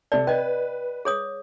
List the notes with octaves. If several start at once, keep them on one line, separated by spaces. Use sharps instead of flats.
C3 A4 D5
B4 D5 D#5 G5
G#4 C#5 D#6